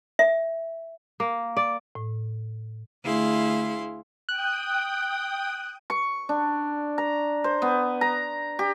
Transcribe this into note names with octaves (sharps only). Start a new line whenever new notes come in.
E5
A#3
D5
A2
D2 E4 G#4 F5 C6
G5 D#6 F#6
C#6
D4
A#5
C5
B3
A#5
G4